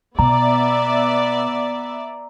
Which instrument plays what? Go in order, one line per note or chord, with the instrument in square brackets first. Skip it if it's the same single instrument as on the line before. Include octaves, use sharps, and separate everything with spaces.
[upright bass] B2 [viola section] B3 D5 E5 [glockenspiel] A#5